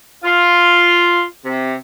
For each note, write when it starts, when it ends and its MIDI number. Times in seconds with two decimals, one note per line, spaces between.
0.24 1.23 65
1.45 1.75 48